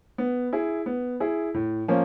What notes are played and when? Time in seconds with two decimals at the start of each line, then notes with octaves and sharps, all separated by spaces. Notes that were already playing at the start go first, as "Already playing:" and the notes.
0.18 B3
0.53 E4 G#4
0.86 B3
1.20 E4 G#4
1.54 A2
1.88 F3 A#3 C#4